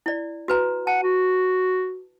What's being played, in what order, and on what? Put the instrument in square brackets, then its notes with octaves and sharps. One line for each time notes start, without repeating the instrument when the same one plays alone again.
[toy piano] E4 D5
F#4 B4 A#5
[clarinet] F#5 [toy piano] A5
[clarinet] F#4